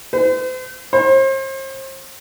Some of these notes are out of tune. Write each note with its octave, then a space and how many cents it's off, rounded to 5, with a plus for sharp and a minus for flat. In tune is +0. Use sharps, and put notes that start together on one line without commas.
C5 -40
C5 +40